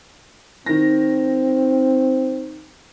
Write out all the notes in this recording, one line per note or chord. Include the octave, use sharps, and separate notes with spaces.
D#3 C4 A#6